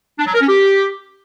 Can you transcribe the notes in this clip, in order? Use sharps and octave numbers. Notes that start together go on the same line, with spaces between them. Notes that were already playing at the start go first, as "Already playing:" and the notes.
D4
F#3
A#4
C#4
G4